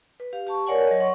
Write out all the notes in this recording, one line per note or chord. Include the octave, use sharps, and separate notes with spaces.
B4
G4 F5
G4 A5 C#6
A#4 C#5 D5 F#5 G#5
F#3 C#5 D#5
F#5 C6 C#6